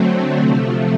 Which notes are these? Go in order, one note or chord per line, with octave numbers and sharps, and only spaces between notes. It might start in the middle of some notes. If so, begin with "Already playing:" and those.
Already playing: D3 F#3 A3 C4
C3 F3 A3